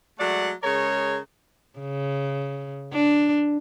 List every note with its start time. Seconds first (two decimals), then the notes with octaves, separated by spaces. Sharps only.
0.19 F#3 G#3 A3 D5 F#5
0.63 C#3 G#3 A#4 C#5
1.79 C#3
2.93 D4